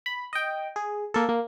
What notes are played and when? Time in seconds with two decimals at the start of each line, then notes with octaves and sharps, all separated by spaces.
0.06 B5
0.33 D#5 G5
0.76 G#4
1.14 A#3 A4
1.29 A#3